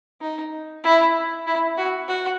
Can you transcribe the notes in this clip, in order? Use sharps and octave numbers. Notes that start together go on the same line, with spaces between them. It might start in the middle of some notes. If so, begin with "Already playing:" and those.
D#4
E4
E4
F#4
F#4